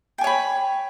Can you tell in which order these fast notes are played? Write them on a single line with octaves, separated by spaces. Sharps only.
G5 G#5 C#5 B5